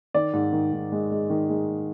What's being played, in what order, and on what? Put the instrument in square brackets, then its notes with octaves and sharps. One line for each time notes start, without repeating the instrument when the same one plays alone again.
[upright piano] D#3 D5
G#2
D#3
G#2
G#3
G#3
D#3
G#3